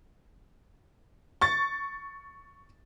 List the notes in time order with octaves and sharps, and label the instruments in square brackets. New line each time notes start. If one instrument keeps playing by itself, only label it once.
[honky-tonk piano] C#6 A6